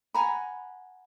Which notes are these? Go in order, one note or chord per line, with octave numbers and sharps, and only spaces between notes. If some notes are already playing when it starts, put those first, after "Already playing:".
F#5 G#5 A#5 B5